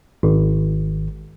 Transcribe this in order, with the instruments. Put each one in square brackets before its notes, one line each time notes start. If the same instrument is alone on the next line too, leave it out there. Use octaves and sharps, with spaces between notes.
[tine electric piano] G#1